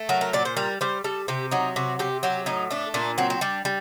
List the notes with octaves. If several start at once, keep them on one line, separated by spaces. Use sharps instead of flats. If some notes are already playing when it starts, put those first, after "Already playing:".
Already playing: A3
F#3 A#4
A#4
A#2 D5
C5
G3 A#4
G3 C5
G3 A4
C3 G4
F#3 D#4
C3 F#4
C3 G4
F#3 G4
A2 D#4
A3 D4
A#2 D4
F#3 C4
C4
G3 D4
G3